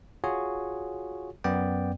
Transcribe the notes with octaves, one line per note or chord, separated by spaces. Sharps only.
F4 F#4 G#4 C#5
F#2 B3 D5 G5